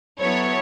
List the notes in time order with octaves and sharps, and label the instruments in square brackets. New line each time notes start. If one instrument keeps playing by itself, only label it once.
[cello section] F#3 B3 E4 A4 [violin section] C#5